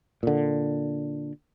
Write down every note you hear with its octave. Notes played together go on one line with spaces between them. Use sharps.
A#2 D3